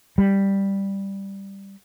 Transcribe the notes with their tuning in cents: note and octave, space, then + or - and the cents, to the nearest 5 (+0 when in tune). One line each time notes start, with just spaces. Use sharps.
G3 +5